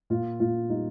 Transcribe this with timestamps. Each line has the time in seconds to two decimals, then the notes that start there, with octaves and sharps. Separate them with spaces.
0.10 A#2 F4
0.40 A#2 F4
0.70 G3 D#4